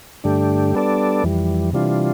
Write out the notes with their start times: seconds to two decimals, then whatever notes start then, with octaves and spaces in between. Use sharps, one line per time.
0.24 G2 D3 A3 D4 G4
0.74 G3 B3 D4 A4 D5
1.24 F2 E3 G3
1.73 C3 E3 G3 D4 F4